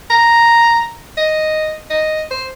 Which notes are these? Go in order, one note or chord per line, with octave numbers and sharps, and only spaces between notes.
A#5
D#5
D#5
C5